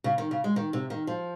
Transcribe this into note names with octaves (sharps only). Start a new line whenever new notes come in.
C#3
D#3
C#3
G#3
D#3
C3
D#3
F3